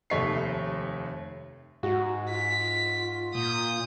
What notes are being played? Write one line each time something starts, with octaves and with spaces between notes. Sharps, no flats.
F1 D#2 A3 C#5 B6 C7
G#2 F#4
F4 B6
A#2 D#6 G6